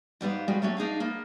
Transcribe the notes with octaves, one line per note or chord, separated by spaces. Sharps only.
G#2 G3 B3 F5
G3 G#3 C4 F#4 B4
F#3 A3 A#3 C#4
D4 D#4 G#4 F5
A#3 B3